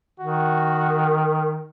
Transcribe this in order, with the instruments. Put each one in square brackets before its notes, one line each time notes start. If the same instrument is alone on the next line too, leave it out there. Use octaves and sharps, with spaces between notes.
[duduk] D#3 [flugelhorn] F#4